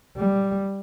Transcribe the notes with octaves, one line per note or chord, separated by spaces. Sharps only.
G3